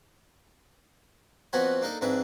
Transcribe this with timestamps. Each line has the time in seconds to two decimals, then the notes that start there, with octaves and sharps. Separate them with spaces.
1.53 F2 F3 B3 F#4 C#5 B5
1.82 A#3 D4 D#4 A4
2.01 F2 G#2 D4 B4 E5